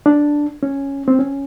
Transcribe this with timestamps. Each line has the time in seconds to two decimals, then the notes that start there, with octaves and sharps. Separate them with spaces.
0.06 D4
0.63 C#4
1.08 C4
1.19 C#4